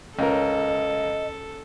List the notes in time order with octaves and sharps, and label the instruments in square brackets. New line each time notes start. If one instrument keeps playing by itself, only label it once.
[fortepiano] C#2 A#4 [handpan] C#4 [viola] A4 [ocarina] D#5